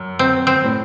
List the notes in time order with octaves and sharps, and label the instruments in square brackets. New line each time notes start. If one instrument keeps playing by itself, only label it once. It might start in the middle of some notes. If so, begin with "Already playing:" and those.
Already playing: [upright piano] F#2
[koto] C4
C4
[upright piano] A2